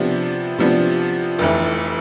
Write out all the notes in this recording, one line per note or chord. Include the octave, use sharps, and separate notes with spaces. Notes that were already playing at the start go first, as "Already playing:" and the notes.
Already playing: C3 F3 B3 D4
C3 F3 B3 D4
F1 F2 E3